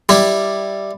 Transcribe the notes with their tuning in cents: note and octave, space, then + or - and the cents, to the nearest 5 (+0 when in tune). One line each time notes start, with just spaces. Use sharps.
G3 +0 E4 +0